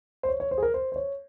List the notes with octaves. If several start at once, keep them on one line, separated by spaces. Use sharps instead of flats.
C5
C#5
C#5
C5
G#4
A#4
C5
C5
C#5